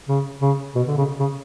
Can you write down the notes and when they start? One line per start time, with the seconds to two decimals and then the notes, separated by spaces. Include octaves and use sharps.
0.08 C#3
0.41 C#3
0.75 B2
0.87 D3
0.97 C#3
1.19 C#3